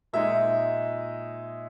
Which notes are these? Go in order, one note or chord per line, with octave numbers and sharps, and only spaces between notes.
A#2 G#3 D#4 E5